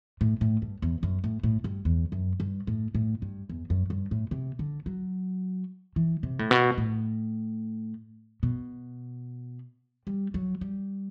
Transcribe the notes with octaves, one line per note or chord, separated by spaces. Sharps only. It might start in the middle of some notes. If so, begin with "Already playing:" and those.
A2
A2
G2
E2
F#2
A2
A2
G2
E2
F#2
G2
A2
A2
G2
E2
F#2
G2
A2
C3
D3
F#3
E3
C3
A2
B2
A2
B2
G3
F#3
G3